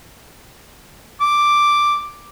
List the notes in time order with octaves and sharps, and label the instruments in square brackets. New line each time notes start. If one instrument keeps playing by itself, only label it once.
[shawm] D6